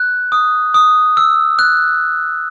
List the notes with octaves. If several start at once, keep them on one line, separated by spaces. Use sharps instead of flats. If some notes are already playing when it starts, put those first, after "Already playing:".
Already playing: F#6
D#6
D#6
E6
F#6